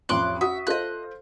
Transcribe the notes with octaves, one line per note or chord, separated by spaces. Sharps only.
A1 F2 C6 D6 F#6
F#4 E5 D#6
F4 A4 C5 D#5 F#6